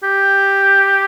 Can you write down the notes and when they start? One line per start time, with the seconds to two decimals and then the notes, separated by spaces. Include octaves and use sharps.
0.03 G4